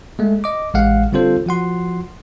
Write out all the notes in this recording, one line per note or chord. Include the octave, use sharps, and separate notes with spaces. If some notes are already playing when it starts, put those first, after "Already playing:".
G#3 A3
D#5 D6
A1 G#3 F5 F#5
D3 G3 C4 F4 A4 C5
F3 F#4 F#5 C6